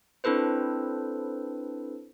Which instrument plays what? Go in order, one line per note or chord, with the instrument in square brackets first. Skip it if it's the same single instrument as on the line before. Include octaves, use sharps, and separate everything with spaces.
[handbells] C4 D4 E4 A4 B4 C5